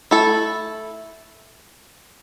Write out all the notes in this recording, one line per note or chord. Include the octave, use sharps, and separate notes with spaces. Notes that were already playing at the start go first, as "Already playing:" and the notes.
A3 E4 A4